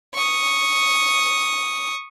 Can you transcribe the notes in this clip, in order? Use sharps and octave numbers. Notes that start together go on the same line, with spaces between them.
C#6 D#6